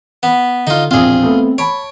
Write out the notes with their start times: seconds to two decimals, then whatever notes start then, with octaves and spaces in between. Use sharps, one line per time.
0.23 B3
0.67 D3 D#4 F4
0.91 E1 A#1 C4 F4 G#4
1.24 A3 B3
1.58 C#5 A5 B5 D7